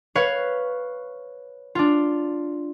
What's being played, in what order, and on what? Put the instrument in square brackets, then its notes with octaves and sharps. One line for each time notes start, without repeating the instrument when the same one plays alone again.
[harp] B4 C#5 F5
D4 F4